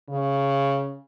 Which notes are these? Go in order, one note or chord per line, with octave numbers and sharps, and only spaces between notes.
C#3